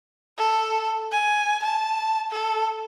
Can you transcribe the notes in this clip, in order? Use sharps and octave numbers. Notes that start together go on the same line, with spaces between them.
A4
G#5
A5
A4